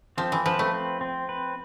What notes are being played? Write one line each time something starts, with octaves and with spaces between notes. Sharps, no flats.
F3 C4
E3
F3 B4
A3
C4
C4
B4